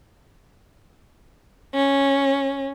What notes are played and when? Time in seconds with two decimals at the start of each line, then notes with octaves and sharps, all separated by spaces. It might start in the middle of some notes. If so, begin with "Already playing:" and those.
1.74 C#4